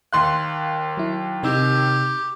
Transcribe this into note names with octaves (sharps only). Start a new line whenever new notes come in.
D#2 F5 C6 F#6
F#3 E4
C3 D#4 G4 E6